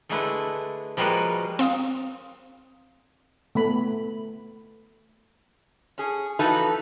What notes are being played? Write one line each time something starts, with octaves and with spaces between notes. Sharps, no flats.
D3 G#3 A3 D4 E4 B4
F3 G3 G#3 A#3 F#4 B4
C4 F5 D#6
A3 B3 B5
C#4 G#4
E3 F3 D#4 F#4 A4 B4